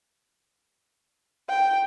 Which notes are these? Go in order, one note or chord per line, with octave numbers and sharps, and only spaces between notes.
G5